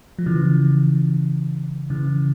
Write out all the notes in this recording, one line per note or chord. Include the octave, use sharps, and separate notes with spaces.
F3
C#3 E3
C#3 E3